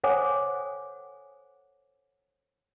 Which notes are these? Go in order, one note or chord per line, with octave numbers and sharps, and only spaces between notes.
A4 C5 C#5 F#5 G#5 D6